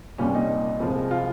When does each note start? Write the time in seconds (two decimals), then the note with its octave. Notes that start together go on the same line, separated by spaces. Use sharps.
0.18 C2 A#2 G3 C#4
0.34 D#4
0.80 C2 C3 F3 G#3
1.11 F4